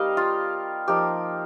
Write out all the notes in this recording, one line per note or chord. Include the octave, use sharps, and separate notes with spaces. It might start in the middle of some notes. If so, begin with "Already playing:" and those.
Already playing: G3 C4 D#4 G4 A#4 D#5 F5
F4
F3 A#3 D#4 G4